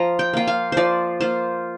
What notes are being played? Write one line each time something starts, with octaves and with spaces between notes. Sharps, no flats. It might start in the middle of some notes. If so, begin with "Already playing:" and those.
Already playing: F3 A#5
G5
A#3 F4 G5
F5
F3 C5 D5
A#3 F4 C5